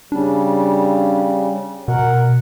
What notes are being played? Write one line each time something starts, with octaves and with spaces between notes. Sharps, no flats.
C#3 G3 D4
B2 A#4 F#5